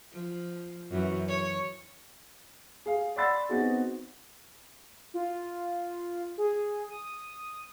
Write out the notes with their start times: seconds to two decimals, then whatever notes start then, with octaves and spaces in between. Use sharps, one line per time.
0.13 F3
0.90 F#2 E3
1.28 C#5
2.86 G#4 F5
3.16 D5 F#5 B5 C6 E6 A6
3.49 B3 C4 D#4 F#4 G#4
5.14 F4
6.38 G#4
6.90 D#6